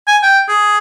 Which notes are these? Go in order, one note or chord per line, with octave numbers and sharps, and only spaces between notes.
G#5
G5
G#4